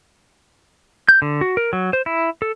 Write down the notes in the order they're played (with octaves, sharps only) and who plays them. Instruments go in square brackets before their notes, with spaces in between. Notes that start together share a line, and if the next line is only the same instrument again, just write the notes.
[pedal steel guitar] G6
D3
F#4
A#4
F#3
C5
E4
A4